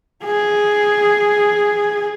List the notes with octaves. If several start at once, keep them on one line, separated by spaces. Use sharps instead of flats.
G#4